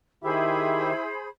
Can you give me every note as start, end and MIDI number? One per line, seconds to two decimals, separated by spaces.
0.24 0.92 51
0.24 1.11 64
0.24 0.92 67
0.24 1.29 68
0.24 1.29 72
0.24 0.92 76
0.24 1.29 83